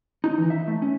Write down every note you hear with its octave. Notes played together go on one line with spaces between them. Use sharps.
D#4
E3
E5
A3
C#4